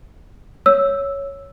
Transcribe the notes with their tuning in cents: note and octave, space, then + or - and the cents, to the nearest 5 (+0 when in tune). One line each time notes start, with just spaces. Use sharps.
C#5 +0 E6 +0